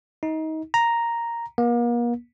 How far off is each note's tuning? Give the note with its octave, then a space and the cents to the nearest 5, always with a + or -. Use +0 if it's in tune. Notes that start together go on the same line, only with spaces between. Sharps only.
D#4 +25
A#5 +0
A#3 +40